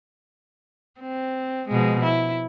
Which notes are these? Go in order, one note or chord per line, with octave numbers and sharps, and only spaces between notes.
C4
B2 F3 G#3
E4